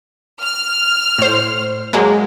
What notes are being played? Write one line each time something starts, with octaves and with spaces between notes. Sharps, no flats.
F6
A2 C5
F#3 G#3 A#3